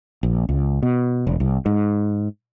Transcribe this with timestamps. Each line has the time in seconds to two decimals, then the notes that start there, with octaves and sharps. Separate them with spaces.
0.23 A#1
0.49 C#2
0.82 B2
1.27 E1
1.40 C2
1.66 G#2